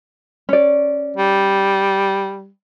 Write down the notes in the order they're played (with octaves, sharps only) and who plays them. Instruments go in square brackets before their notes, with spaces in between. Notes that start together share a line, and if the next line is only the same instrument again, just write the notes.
[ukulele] C#4 D5
[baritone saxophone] G3